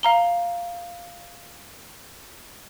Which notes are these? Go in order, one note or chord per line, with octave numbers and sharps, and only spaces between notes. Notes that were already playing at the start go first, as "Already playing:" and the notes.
F5 A#5 G7